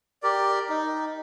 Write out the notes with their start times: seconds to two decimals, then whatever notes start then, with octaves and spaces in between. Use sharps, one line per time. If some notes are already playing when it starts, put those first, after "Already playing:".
0.23 G4 A#4 D5
0.69 D#4